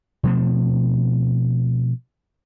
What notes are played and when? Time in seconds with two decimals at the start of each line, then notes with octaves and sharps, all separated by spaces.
0.23 B2 F3 A3 C4